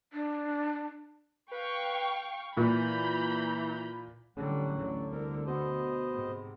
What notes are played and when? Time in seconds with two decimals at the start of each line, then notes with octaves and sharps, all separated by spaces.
0.13 D4
1.52 B4 F5 G5 C#6
2.57 A#2 E3 A#5 B5 G6
4.37 A1 D3 F#3 G3 F#5
4.77 D2 D3
5.12 C2 A#4
5.47 B2 B3 C5 D#5
6.11 G#2 C3